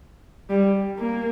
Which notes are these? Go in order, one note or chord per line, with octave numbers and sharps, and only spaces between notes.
G3
A#3